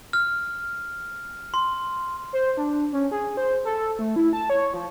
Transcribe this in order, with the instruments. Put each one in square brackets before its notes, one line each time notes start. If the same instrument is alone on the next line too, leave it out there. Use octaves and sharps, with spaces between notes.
[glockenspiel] F6
C6
[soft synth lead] C5
D4
C#4
G#4
C5
A4
A3
E4
A5
C#5
F3